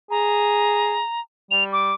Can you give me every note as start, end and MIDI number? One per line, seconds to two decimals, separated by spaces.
0.11 1.01 68
0.11 1.20 82
1.51 1.92 55
1.51 1.64 101
1.73 1.95 86